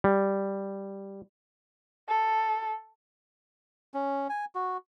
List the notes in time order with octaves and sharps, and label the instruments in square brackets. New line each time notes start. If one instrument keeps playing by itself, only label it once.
[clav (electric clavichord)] G3
[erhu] A4
[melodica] C#4
G#5
F#4